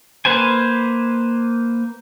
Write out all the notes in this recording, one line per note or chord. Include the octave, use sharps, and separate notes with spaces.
A#3 B4 C5 G#5